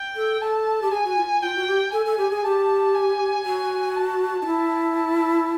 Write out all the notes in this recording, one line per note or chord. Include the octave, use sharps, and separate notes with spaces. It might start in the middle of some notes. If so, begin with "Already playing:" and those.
Already playing: G5
A4
A4 A5
G4
G#4 G#5
F#4
F4
F4 G5
F#4
G4
A4 G#5
A4
G4
G#4
G4 A5
G#5
F#4
A5
D#4
E4
A5